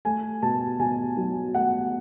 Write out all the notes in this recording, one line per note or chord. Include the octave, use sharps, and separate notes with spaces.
A3 G#5
B2 A5
B2 G#5
F#3
A3 F#5